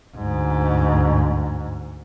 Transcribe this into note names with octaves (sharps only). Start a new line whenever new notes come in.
D2 G#2